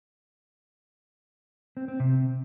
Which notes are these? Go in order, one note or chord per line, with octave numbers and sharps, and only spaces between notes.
C4
C4
C3